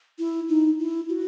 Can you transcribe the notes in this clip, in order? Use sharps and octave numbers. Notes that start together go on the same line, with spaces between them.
E4
D#4
E4
F#4